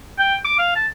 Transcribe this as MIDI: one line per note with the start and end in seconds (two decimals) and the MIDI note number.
0.19 0.36 79
0.45 0.58 86
0.59 0.71 77
0.76 0.87 81